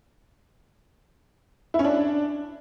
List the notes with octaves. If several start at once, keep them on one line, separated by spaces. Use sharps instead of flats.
E4
C#4
D4